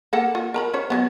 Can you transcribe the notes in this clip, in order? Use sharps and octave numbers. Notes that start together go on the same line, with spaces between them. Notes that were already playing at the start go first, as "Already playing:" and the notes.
A#3 A4 F#5
F4
A#4 A#5 B5
C#4 C5 C#5
F#3 A3 B3